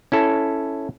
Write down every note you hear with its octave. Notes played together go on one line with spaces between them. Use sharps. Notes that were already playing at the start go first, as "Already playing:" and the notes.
C#4 E4 A4